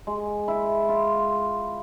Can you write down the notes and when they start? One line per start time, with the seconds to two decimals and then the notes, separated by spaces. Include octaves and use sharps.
0.07 G#3
0.48 E4
0.89 F4